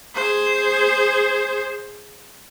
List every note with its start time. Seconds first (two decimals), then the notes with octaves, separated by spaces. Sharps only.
0.15 G#4 C5